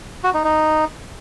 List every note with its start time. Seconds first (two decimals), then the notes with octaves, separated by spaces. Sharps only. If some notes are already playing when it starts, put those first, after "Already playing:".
0.24 F#4
0.34 D#4
0.44 D#4